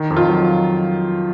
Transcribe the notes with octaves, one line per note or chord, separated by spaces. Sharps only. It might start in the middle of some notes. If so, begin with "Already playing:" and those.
Already playing: D#3
F2
F4
F#3